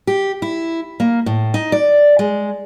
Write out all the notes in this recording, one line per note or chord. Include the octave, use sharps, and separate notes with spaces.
G4
E4
A#3
A2
D#4
D5
G#3